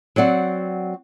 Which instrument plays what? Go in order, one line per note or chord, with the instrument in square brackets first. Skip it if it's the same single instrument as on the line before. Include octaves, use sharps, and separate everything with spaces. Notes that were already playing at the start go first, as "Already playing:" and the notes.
[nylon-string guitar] F#3 C4 D5 F#5